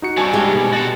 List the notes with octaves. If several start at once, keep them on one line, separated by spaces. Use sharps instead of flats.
D#4 F#4 C#7
G3 C4 D4 G#5 A5 C#6
G#3 G4
B2
F#4 A4 A6